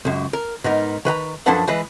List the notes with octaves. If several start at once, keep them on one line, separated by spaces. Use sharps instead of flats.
C#2 F#2
A#4
G#2 B3 D#4 A#4
D#3 B4 F#5 A#5
F#2 F3 D4 A4 B4 F#5
E3 G#3 B4